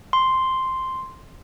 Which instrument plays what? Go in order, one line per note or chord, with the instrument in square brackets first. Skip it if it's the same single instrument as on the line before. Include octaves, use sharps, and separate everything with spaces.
[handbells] C6